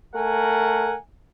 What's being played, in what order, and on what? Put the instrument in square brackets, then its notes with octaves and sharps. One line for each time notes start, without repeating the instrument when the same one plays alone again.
[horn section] A3 A#4 F#5 G#5